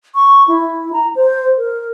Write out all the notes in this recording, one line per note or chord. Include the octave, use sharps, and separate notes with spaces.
C#6
E4
A#5
C5
A#4